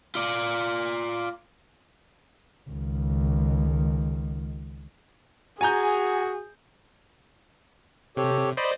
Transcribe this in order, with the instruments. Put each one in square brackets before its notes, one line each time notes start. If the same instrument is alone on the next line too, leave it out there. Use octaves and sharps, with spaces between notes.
[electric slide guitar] F4 D5
[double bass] C#2 D#3
[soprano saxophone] F#4 [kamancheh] G#4 [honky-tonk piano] G#5 A#5 G6
[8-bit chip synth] C3 [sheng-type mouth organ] G4 A4 C#5
[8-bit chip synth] C5 D5 D#5 [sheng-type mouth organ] B5